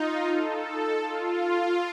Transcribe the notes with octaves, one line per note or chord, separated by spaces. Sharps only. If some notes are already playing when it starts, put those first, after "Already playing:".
Already playing: D#4 F4
A4
F4